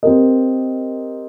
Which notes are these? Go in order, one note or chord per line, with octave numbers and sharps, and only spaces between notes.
C4 G4 A#4 D#5